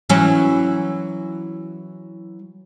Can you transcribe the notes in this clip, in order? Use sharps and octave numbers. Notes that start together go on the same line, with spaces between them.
E3 F#3 C#4